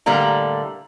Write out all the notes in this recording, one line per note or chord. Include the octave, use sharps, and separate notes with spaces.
A2 D3 G3 A#3 A#5